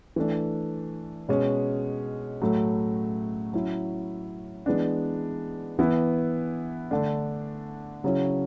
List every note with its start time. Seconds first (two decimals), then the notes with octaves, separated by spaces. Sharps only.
0.16 E3 A3 D4
1.29 B2 G#3 C#4
2.42 A2 F#3 A3
3.53 F#3 C#4 E4
4.66 E3 G#3 B3 D4
5.79 E3 B3 E4
6.91 D3 A3 D4
8.04 C#3 F#3 C#4 E4